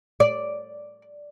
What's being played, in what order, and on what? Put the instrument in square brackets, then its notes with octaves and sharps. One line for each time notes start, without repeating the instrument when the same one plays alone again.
[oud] D5